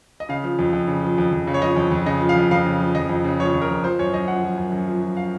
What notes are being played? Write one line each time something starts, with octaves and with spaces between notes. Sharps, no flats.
D#5
C#3 F5
F3
F2
F2
C#3
F3
F2
F2
C#3
C#5
F3 D#5
F2
F2
C#3 D#5
F3
F5
F2
F2 F5
C#3
F3
F2 D#5
F2
C#3
F3 C#5
F2
A#4
F2
F3 C5
F#2 C#5
F#2 D#5
F3 F#5
F3
F#2
F#2
F3
F3
F5